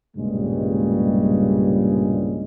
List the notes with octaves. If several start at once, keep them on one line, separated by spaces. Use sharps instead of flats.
B1 G2 A#2 C#3 G3 G#3